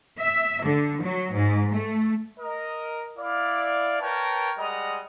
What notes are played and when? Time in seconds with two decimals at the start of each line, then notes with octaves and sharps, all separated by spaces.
0.19 E5
0.64 D3
1.02 F#3
1.33 G#2
1.73 A3
2.39 A#4 D#5
3.18 E4 D5 F5
4.00 A#4 B4 C#5 G5 A5
4.58 G3 G#3 D#5 F#5 A#5 D#6